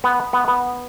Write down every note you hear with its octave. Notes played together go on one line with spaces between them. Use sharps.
B3
B3
B3